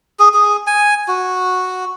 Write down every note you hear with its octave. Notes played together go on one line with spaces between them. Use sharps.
G#4
G#4
G#5
F#4